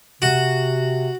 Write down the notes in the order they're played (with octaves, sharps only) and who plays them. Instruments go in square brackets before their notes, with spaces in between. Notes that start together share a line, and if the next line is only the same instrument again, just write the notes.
[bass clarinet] C3 [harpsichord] F#4